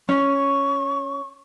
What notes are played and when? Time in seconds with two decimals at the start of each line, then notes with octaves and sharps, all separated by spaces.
0.09 C#4 C#6